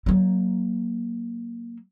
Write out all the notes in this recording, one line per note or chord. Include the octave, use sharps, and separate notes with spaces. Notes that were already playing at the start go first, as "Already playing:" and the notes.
F#3 A#3